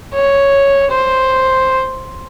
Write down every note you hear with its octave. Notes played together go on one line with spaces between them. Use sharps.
C#5
C5